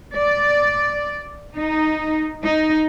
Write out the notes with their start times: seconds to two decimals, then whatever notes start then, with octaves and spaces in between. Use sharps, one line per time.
0.15 D5
1.56 D#4
2.44 D#4